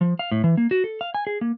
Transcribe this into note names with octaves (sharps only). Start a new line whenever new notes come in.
F3
F5
A2
E3
A#3
F#4
A4
F5
G#5
G#4
A#3